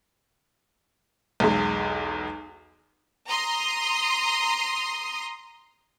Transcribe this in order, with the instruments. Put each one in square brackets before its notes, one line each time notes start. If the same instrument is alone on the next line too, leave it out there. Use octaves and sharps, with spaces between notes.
[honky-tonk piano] B1 E2 G#3
[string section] A#5 C6 D#6